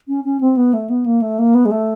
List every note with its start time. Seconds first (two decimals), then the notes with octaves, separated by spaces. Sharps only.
0.08 C#4
0.24 C#4
0.41 C4
0.57 B3
0.73 A3
0.90 B3
1.06 A#3
1.22 A3
1.39 A#3
1.55 B3
1.65 G#3
1.71 A3